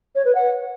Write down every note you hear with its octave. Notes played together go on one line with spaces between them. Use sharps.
C#5
B4
F#5